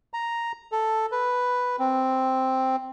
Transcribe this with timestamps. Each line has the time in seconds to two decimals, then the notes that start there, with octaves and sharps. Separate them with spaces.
0.14 A#5
0.72 A4
1.12 B4
1.79 C4